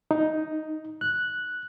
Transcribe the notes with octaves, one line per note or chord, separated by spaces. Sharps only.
D#4
F#6